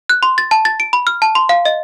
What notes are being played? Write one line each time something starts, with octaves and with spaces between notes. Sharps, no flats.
F#6
C6
A6
A5
A6
D7
B5
F6
A5
C6
F5
D#5